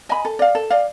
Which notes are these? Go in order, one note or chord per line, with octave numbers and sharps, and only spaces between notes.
D#5 G#5 B5
A4
D5 F5
A4
D5 F5